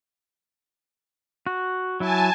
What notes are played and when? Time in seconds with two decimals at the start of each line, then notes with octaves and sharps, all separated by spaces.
1.47 F#4
2.00 F#3 E4 G#5 A5